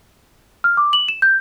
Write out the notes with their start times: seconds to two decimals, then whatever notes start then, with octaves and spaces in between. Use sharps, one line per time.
0.64 F6
0.77 D6
0.93 F#7
1.08 E7
1.22 G6